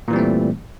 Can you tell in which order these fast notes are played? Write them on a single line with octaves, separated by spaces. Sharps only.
A#2 E3 G3 C4 A3